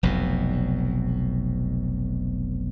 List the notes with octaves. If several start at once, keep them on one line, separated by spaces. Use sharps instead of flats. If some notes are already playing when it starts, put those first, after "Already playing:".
F1 B1 F2 B2